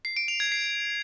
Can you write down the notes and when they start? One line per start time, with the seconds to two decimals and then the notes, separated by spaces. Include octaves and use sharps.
0.05 C7
0.17 D7
0.28 F7
0.40 G#6
0.52 C7